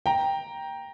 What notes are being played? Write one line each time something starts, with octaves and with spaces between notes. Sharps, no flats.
G5 A#5